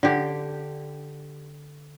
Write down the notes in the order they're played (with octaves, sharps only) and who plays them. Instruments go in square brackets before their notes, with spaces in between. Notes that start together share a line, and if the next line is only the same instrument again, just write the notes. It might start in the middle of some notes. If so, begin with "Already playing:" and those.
[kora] D3 G4